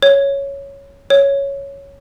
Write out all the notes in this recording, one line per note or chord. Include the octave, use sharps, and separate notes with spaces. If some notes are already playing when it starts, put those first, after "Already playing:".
C#5
C#5